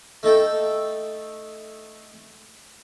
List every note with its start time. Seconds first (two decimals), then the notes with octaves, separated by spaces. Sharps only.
0.23 A3 D#4 A4 G5